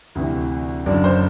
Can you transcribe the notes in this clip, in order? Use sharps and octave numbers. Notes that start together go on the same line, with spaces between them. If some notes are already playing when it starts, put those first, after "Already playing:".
D2 C3 E3
F#1 F#2 D3 D5
C5